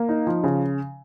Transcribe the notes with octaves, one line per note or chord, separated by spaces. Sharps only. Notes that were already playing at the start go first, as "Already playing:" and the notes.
Already playing: A#3
D#4
F3
C#3